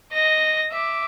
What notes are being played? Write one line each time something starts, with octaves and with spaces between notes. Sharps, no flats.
D#5 A#6
E5 D6